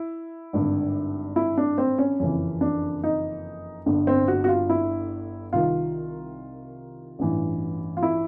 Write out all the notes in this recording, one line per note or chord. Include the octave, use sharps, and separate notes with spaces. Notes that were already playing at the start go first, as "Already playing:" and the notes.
Already playing: E4
G#1 G2 D3
E4
D4
C4
C#4
F#1 F2 C#3 E3 C#4
D4
D#4
G1 G2 D3
C4
F#4
F#4
F4
E4
C2 C3 D#3 F4
A1 G2 E3
F4
E4